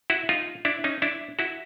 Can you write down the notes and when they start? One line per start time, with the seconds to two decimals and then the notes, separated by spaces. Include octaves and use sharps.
0.10 E4 F#4
0.29 D#4 F4
0.65 D4 E4
0.84 C#4 D#4
1.02 D4 E4
1.39 E4 F#4